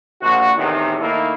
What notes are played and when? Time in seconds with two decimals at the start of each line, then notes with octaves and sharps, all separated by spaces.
0.21 A#1 F#4
0.57 E2 A2 C3 D#3
1.00 D#3 A3 A#3 D#4 E4